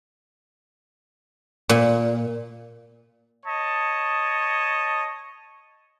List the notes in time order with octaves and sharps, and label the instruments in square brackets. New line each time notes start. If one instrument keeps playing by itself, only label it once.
[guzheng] A#2
[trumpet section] C#5 D#5 A5